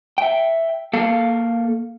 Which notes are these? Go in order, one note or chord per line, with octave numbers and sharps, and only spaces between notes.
E5 G5
A#3 A4 F5